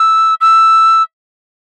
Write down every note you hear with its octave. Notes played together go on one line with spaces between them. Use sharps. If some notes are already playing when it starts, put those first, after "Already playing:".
Already playing: E6
E6